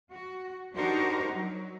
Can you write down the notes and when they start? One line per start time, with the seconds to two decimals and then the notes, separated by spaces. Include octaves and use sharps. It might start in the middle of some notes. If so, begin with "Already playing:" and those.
0.12 F#4
0.75 D4 D#4 F#4 G4 A#4 C5
1.34 F#3